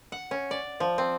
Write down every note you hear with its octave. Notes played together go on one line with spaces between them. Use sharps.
F#5
C#4
D5
F3
C4